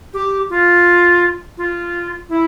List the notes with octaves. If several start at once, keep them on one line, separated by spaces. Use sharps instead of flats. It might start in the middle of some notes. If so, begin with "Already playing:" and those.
G4
F4
F4
E4